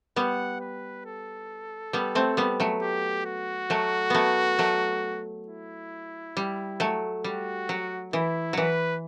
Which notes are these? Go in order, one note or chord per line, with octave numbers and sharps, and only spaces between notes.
G3 B3 F#5
B4
A4
G3 B3
A3 C4
G3 B3
F#3 A3
G4
F#4
F#3 A3
F#3 A3 B3
F#3 A3
E4
G3
F#3 A3
G3 F#4
F#3
E3 E4
E3 F#3 B4